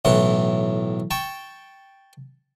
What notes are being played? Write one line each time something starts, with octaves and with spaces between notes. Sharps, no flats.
B1 A2 E3 F#5
G5 A5 C#6